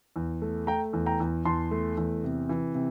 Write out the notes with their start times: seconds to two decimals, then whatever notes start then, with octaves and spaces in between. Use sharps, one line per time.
0.16 E2
0.42 A3
0.67 A3 G5 A#5
0.93 E2
1.06 G5 A#5
1.20 E2
1.45 E2 A5 C6
1.71 A3
1.97 E2
2.24 C3
2.49 E3
2.75 C3